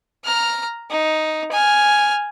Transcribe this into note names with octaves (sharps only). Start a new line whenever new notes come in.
A#5 F6
D#4
G#5 F6